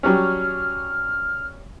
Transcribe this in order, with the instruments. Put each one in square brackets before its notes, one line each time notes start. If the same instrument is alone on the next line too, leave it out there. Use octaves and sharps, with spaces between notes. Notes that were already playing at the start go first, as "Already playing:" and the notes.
[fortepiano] F#3 G3 C#4 [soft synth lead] F6